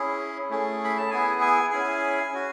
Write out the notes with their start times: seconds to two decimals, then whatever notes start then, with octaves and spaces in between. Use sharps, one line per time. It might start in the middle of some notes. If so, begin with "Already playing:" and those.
Already playing: C#4 E4 G#4
0.50 A3 C#4 E4 G#4
0.84 B5
0.98 A5
1.10 B3 E4 G#4 G#5
1.41 G#5
1.70 C#4 E4 G#4 G#5
2.31 C#4 F#4